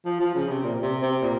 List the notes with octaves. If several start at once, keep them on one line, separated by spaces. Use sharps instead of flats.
F3
F3
C#3
C3
A#2
C3
C3
A#2